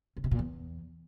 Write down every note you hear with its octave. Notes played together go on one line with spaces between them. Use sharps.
C#3
C3
A#2
E2